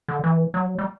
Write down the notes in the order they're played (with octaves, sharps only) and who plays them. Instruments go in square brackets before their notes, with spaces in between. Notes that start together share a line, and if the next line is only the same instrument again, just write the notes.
[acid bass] D3
E3
F#3
G3